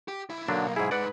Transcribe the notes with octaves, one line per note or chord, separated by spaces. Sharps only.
G4
B1 E4
B1 D3 F#3 A#3 D4
G#2 E4 G#4
G#2 B4 D5 F#5